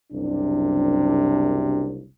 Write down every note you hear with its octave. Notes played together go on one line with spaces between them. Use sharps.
F#1 C2 F#2 C3 D4